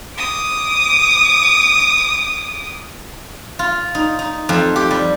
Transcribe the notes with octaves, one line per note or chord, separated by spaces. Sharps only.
D6 D#6
F4
D#4
D#4
F2
G4
G3